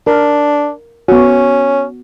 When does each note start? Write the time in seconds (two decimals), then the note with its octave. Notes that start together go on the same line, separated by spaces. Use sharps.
0.07 D4 A#4
1.08 B3 C#4 F#4